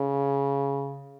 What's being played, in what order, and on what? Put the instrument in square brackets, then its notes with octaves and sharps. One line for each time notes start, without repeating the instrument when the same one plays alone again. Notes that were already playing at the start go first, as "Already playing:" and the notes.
Already playing: [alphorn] C#3